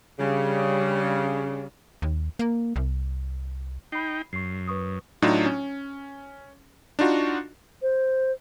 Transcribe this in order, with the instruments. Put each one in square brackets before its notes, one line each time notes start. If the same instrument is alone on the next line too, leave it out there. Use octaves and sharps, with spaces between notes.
[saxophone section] C#3 [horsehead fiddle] G3 D4
[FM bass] D#2
A#3
C2
[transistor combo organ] D#4 G5 [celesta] B5 C7
[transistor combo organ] F#2 [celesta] C#6 C7
[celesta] B4 C#6 D#6
[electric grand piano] A2 F#3 D4 D#4 F4
C#4
D4 D#4 F4 F#4
[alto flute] C5